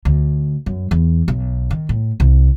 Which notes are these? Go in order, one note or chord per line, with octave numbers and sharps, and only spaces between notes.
D2
F#2
E2
B1
D#3
A2
C2